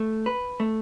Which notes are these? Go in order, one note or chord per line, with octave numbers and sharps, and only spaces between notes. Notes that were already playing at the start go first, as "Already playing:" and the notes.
Already playing: A3
B4
A3